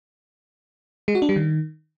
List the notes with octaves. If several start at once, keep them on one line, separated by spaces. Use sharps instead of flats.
G#3
F#4
D4
G3
D#3